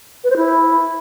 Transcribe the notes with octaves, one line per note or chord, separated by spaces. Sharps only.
B4
C5
E4